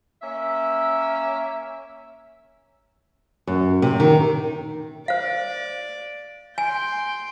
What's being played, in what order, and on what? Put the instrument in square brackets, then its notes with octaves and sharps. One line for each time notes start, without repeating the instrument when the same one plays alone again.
[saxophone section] A#3 C#4 E5
[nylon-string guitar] F#2
C3
D#3
[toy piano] C5 F5 [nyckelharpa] D5
[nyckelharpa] G5 C6 [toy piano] G#5